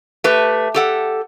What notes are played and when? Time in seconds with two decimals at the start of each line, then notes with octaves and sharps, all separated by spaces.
0.24 A3 G4 B4
0.74 G4 A4 F#5